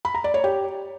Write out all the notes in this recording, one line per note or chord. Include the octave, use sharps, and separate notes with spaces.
B5
A#5
D5
C#5
G4